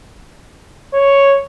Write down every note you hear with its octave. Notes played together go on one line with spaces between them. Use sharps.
C#5